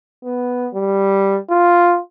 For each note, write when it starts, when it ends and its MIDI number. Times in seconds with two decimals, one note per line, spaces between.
0.24 0.68 59
0.74 1.38 55
1.50 1.98 65